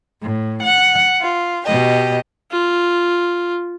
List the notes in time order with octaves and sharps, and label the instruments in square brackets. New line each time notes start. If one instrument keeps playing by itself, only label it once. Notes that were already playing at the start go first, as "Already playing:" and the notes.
[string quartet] A2
F#5
F4
B2 G4 D#5
[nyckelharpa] F4